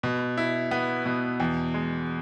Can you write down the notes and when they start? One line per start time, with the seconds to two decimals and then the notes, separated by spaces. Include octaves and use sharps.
0.03 B2
0.38 E4
0.71 B3
1.06 B2
1.40 E2
1.74 G#3